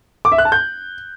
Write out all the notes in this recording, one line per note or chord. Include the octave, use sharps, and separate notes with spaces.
D6
E5
F#6
A5
G6